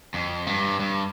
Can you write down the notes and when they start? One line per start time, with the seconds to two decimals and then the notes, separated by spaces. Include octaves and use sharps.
0.14 F2
0.47 G2
0.80 G2